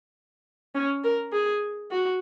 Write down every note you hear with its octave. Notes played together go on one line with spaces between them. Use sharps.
C#4
A#4
G#4
F#4